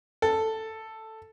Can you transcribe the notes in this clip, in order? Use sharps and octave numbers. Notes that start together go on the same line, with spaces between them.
A4